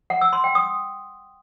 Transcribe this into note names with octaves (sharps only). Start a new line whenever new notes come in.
F#5
E6
C6
G5
D#6